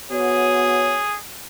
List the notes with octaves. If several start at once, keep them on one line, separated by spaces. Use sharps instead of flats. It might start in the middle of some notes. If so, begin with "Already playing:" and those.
B3 F#4 G#4 C#5